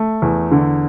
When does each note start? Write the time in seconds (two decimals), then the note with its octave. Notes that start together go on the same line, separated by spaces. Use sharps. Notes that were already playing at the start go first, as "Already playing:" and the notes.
Already playing: A3
0.22 E2
0.51 D3